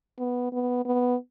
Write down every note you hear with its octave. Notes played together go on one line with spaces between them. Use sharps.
B3
B3
B3